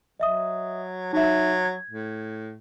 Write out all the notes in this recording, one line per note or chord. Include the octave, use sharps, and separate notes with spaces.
F#3 D#5 E5 D#6
F#3 D#4 E5
G#6
A2